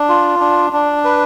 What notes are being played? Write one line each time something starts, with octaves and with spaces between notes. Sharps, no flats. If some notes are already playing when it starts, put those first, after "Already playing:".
Already playing: D4
F4
D4
D4
B4